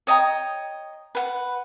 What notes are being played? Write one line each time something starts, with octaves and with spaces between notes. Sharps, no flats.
C#5 D#5 G5 A#5
B4 F#5